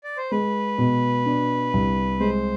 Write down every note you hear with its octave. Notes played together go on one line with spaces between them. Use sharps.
D5
C5
G#3 B4
B2
D4
C2
G#3 C5